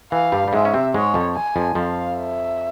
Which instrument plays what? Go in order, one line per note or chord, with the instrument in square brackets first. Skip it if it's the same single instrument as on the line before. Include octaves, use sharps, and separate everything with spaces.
[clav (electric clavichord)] E3 [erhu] F5
[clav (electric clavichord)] G2 G3
G3
[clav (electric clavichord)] G#2 G#3 [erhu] E5
[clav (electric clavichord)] C#4
C3 C4
[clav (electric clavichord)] G#2 G#3 [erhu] C#5
[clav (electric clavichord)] F2 F3
[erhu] G#5
[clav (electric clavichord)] F2 F3
[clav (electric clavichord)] F2 F3 [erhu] F5
[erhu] E5